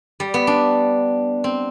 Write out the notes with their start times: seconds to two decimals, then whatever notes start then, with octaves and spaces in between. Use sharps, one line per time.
0.20 G3
0.34 B3
0.47 D4
1.44 C4